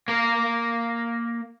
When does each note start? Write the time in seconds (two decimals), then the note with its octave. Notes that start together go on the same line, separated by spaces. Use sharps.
0.08 A#3 A#4